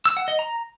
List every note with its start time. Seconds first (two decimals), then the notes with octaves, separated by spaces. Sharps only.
0.05 E6
0.17 F#5
0.28 D#5
0.39 A#5